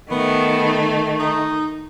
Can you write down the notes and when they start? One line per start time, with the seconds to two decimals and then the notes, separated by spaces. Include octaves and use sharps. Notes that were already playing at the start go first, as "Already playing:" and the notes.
0.11 D#3 A3 B3
1.19 D#4